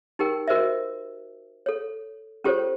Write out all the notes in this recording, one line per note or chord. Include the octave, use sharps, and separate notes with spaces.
D#4 G4 A#4 G5
F#4 A#4 C5 D#5 E5
A4 C#5
C#4 F4 G4 A4 C5 C#5